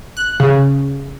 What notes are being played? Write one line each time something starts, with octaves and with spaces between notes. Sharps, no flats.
F#6
C#3